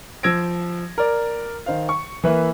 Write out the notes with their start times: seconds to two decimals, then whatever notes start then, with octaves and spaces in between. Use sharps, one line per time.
0.23 F3 E6 G#6 A#6 D7
0.98 A#4 D5
1.66 D#3 C5 F5
1.89 C#6
2.24 E3 A#3 B4 E5